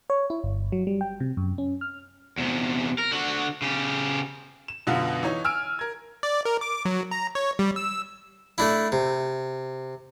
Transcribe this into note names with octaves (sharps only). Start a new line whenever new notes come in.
C#5
E4
G1
F#3
G3
G5
C3
F#2
C#4
F6
E2 C3
A#4
D3 F#4
C#3 G4
E7
F#2 B2 D3 B3 F4
E3 D#4 C#5
G#5 E6 F6 D7
A#4 G#6
D5
A#4
D6
F#3
A#5
C#5
G3
E6
A3 D4 E4
C3